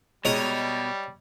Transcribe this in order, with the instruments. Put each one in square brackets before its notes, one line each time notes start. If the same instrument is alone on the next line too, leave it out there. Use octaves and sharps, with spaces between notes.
[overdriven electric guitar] B2 [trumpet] G3 [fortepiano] G#3 [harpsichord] C#5 D#5 A#5